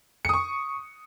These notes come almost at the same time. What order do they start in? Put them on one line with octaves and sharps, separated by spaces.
C#7 D#6 C#6